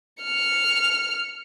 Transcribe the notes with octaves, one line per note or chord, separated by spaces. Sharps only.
F6 C#7